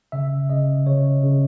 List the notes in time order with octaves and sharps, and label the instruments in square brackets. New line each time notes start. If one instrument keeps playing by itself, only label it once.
[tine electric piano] C#3 E5
C#3 D#5
C#3 C#5
C#3